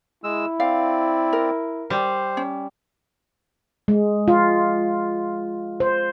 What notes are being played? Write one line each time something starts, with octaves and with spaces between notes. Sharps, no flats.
G#3 E4 E6
C4 D5 F5
A#4
G3 C5
C#4
G#3
F4
C5